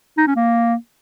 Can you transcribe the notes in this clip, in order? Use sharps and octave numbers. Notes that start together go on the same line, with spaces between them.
D#4
C#4
A#3